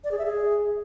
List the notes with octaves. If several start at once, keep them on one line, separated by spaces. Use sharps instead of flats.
D5
G#4
E5
G#4